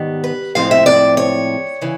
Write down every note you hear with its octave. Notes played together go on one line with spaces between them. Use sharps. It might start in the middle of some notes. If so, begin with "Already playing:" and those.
Already playing: G#2 D#3 G3 B3
B4
A2 F3 G#3 C4 F5
E5
D5
C#5
C#3 E3